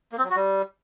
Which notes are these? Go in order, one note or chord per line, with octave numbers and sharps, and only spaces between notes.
A#3
C4
F#3
F#4
G3